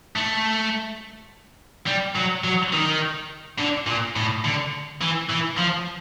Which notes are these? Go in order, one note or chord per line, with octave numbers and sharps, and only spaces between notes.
A3
G3
F#3
F#3
D#3
D3
A#2
A2
D3
E3
E3
F3